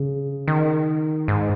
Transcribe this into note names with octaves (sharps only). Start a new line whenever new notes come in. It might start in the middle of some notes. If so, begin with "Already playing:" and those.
Already playing: C#3
D#3
G#2